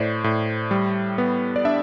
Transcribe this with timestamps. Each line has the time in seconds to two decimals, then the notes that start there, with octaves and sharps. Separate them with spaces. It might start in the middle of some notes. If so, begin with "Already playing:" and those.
Already playing: A2 C5 D5
0.24 A2
0.71 G3
1.18 B3
1.56 D5
1.65 D4 E5